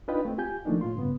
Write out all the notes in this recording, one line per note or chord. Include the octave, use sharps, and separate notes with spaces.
D4 D#4 F4 B4 D#5 G5
A3 C4
F4 G4 G#5 G6
E3 F3 A3 A#3 D4 D#4
A2 F4 C6
G2 C#3 B3